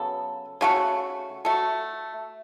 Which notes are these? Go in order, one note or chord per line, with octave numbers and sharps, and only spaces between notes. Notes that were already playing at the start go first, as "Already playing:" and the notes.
Already playing: C#3 F#3 B3 A4
C#3 A3 F#4 A4
A3 F#4 A4